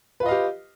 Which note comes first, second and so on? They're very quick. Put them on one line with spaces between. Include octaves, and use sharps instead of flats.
B4 F4 D#5 F5 G4